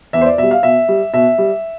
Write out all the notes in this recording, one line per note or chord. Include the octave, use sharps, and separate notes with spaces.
E2 E5
C5
D5
B2 G3 E5
F5
B2 E5
G3
B2 E5
G3